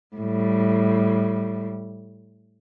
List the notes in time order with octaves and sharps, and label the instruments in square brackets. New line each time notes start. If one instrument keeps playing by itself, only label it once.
[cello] A2 G3